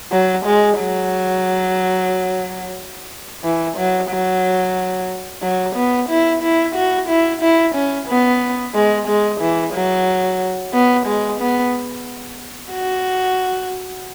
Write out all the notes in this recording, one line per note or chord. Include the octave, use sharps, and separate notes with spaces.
F#3
G#3
F#3
E3
F#3
F#3
F#3
B3
E4
E4
F#4
E4
E4
C#4
B3
G#3
G#3
E3
F#3
B3
G#3
B3
F#4